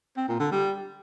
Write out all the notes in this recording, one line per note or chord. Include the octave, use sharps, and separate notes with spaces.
C4
A#2
D3
G3